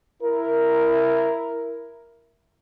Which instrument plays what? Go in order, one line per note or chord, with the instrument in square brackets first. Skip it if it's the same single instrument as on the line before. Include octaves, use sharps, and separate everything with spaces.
[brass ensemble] E4 A#4